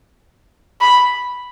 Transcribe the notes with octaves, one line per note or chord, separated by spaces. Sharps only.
B5